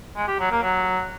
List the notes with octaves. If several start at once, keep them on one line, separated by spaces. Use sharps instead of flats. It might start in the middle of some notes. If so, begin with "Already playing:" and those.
G#3
G4
F#3
A#3
F#3